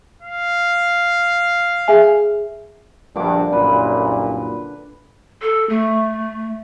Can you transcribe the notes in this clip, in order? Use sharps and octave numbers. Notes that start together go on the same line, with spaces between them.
F5
G#4 E5 G#5
A#1 G2 D3 D6
C2 F#2 A#2 B4
A4
A3